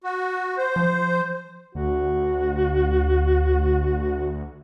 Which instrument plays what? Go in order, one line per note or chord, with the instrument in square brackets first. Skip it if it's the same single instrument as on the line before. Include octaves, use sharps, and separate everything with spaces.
[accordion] F#4
C5
[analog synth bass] F3
[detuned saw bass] D2 [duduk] F#4